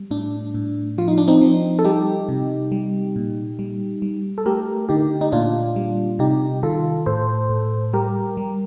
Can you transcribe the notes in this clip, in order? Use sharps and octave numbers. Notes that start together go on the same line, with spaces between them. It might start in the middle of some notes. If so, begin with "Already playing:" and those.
Already playing: G3
A2 D4
A2
F3 F4
D#4
D4
C4 D#4
F3
A4
G3 D#4 G4
C3
G3
A#2
G3
G3
A4
A3 G4 A#4
D3 D#4 G4
D#4
A#2 D4 F4
G3
C3 D#4 G4
D#3 F4 A4
A2 A4 C5
A2
G3 G4 A#4
G3